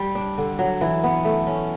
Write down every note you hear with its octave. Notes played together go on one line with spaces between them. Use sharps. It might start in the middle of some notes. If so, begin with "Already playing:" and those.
Already playing: G3
D4
D3
F#3
E3
B3
A3
C#4